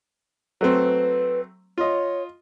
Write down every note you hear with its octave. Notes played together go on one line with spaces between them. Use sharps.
F#3 A3 C4 B4
F4 C#5 D#5